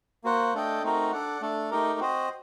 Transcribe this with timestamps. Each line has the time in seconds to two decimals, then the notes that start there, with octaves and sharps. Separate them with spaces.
0.24 A#3 F#4 C5 F#5
0.54 A3 D4 A4 D#5 G5
0.83 A3 C4 D#4 F#4 A#4
1.12 D4 A4 D5 F#5
1.41 A3 D4 A4
1.71 A3 D#4 G4 A#4
1.99 C4 F#4 C5 D#5